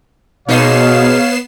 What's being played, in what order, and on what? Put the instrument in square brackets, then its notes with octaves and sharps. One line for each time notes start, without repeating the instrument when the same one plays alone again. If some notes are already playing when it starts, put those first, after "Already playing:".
[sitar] G#2 D#4 [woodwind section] B2 [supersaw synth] B3 C7 E7 [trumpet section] C#5 F5